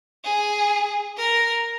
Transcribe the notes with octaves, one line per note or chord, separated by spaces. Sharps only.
G#4
A#4